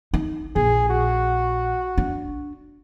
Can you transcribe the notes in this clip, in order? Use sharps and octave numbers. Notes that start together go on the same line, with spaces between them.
D#4
A#1 G#4
F#4
D4